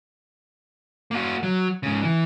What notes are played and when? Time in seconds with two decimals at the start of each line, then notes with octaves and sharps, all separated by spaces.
1.11 A#3 F#4
1.43 F#3
1.83 G#2 C#3
2.03 E3